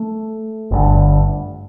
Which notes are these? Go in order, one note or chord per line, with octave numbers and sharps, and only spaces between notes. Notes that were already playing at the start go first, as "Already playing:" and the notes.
Already playing: A3
G1 G2 D3